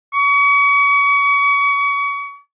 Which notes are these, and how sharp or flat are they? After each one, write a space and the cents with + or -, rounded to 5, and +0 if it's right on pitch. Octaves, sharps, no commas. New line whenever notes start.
C#6 +35